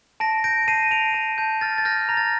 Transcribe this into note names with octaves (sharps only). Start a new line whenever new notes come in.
A5 A#6 D7
G6 A#6 D7
A5 C7 D#7
A5 D7 F7
A5
A5 G6
F6 A6
A6
F6 G6 A#6
A#5 A#6
A6